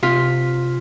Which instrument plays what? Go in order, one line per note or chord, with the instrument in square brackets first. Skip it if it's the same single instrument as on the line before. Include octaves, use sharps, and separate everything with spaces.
[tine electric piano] C3 B6 [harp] F4